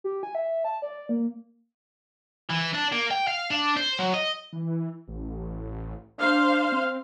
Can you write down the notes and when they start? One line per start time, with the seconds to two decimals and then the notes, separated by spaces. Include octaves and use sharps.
0.04 G4
0.23 G#5
0.35 E5
0.64 A5
0.82 D5
1.09 A#3
2.50 E3
2.75 D4
2.92 A#3
3.11 G5
3.27 F5
3.50 D4
3.77 C5
3.99 F#3
4.14 D#5
4.53 E3
5.08 A1
6.18 D4 C5 F5
6.72 C4